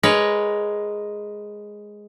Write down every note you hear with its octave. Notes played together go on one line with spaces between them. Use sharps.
G#3 A#4 B4 C#5